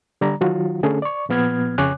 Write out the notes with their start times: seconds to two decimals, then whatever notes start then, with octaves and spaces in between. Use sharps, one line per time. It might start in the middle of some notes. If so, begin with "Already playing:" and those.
0.21 D3 G3 D5 A#5
0.41 D#3 F#3 F4 F#4
0.83 D3 A3 C#4 G#4 A4
1.02 D5 C#6
1.29 A#2 F3 B3 F6 G#6
1.78 F2 C#3 C#5 G#5 D6 F#6